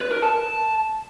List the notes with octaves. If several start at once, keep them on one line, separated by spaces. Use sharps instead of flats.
B4
A#4
A5